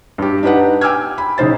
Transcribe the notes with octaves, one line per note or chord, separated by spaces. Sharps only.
G2 G4
D4 D#4 G4 B4 F#5
G5 G#5 D6 E6 F6 G#6
B5
B1 C#3 D#4 C5 A6